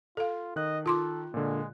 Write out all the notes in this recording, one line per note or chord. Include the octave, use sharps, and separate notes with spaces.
F4 A4 F5
D#3 D#5 F#6
F4 A4 C6 D6
A#2 D3 G#3